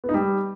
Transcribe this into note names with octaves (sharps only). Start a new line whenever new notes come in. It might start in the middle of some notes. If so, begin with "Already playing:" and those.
B3
D#4
G3